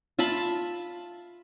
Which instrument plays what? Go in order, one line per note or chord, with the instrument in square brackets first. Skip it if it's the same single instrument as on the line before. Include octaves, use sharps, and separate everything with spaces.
[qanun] F4 E5 A5 B5